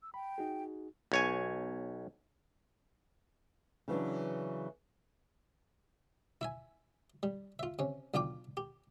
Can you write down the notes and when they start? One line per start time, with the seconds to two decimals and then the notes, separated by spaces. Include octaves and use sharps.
0.03 E6
0.14 G5 B5
0.38 D#4 F#4 G#4
1.12 B1 C#5 G#5
3.88 C#3 E3 F#3 D4
6.41 E4 E5 G#5
7.23 G3
7.59 F4 E5
7.79 C3 C#4
8.14 B1 D4 F4 G5 D6
8.57 G4